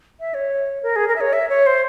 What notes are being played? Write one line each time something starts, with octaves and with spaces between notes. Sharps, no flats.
E5
C#5
A#4
G#4
A#4
E5
C#5
E5
C#5
C5